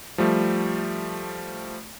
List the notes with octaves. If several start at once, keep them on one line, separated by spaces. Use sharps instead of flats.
F3 G3 A3